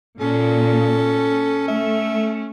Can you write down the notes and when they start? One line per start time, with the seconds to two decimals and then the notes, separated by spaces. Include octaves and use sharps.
0.20 A#2 C#4 A4
1.68 A3 E5